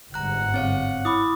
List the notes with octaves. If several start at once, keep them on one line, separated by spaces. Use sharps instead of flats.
G1 G#2 F#5 A#5 F#6
C4 C#5 F5
E4 B5 D6 D#6